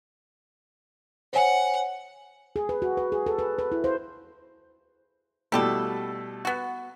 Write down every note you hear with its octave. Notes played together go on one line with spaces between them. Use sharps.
C5 C#5 F#5 G#5
G#4
B4
F#4
B4
G#4
A4
B4
B4
E4
C5
B2 G3 A3 E4 G4 A4
B3 F#4